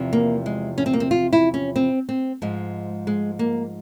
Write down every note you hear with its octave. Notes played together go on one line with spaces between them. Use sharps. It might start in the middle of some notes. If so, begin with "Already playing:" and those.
Already playing: E2 C3 F3
A#3
G#3
C#4
C4
A#3
C4
F4
E4
C#4
C4
C4
G#2 F3 G#3
G#3
A#3